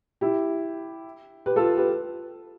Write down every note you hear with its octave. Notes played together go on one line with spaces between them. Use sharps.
E4 G4
G4 B4
F4 A4
G4 B4